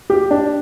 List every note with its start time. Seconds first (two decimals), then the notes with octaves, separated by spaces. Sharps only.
0.10 G4
0.31 D4